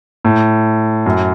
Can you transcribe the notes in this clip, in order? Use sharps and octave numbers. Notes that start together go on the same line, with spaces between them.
A2
F#2